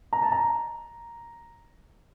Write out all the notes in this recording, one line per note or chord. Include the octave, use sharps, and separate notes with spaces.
A#5
A5
A#5